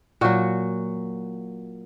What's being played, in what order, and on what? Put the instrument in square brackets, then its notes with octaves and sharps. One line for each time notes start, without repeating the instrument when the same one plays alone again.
[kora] A#2 F#3 F#4